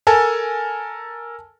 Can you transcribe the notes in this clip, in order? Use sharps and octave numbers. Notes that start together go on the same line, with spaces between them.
A4 A#4 G#5 A5